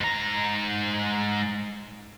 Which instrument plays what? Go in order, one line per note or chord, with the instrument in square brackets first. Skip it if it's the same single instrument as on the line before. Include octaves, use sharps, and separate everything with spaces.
[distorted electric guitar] G#2 A#5